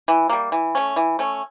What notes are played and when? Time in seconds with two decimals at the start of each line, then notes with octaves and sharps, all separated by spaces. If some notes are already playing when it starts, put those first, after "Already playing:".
0.08 E3
0.30 G3 A#3
0.52 E3
0.75 A3 C#4
0.96 E3
1.19 A3 C#4